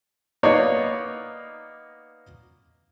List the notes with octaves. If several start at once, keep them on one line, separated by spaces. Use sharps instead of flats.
A#3 B3 D#4 C#5 D5